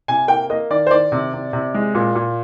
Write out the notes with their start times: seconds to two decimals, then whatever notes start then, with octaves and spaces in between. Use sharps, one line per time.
0.08 C3 G#5
0.28 A#3 G5
0.50 A#3 D#5
0.70 D#3 D5
0.87 C5
0.91 D#3 D5
1.12 C3
1.33 C3
1.53 C3
1.74 G#3
1.95 A#2
2.16 A#2